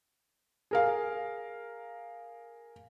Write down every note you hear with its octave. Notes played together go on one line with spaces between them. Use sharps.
G#4 A#4 F5